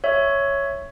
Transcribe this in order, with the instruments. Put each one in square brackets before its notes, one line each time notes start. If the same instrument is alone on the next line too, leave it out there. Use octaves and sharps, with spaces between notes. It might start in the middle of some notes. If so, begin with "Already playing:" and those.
[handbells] C#5 E5